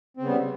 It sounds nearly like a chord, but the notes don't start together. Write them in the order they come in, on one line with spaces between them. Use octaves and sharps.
C4 C#3 B3 G3